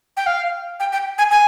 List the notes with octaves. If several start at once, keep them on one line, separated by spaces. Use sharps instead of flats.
G5
F5
G5
G5
G#5
G#5